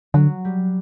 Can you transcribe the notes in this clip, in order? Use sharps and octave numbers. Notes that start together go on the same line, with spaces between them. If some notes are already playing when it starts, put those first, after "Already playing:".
D3 F#3
G3